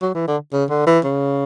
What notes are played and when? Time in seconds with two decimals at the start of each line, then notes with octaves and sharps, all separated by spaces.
0.01 F#3
0.15 E3
0.28 D3
0.53 C#3
0.70 D3
0.87 E3
1.05 C#3